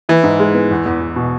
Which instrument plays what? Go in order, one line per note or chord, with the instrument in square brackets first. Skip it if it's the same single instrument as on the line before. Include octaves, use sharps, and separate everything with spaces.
[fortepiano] E3 [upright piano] E4
[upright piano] G#2
G#3
B3
E2
E2
E2
B2